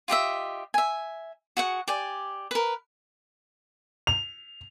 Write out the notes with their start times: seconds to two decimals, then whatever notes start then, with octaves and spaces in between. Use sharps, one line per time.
0.08 F4 G4 D#5 E5
0.74 E5 G#5
1.57 F#4 G#4 F#5
1.88 G4 D5 G#5
2.51 A#4 B4
4.07 F7